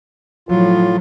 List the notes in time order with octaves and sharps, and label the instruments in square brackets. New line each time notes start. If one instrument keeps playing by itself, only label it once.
[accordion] A2 F4 [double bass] F3 F#3